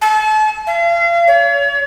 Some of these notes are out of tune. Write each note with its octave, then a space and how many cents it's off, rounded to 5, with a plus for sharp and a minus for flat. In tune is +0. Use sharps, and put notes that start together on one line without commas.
A5 -40
F5 -40
C#5 +40